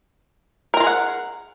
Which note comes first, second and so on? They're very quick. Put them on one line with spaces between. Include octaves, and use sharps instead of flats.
A#4 A#5 F4 G#4 F#5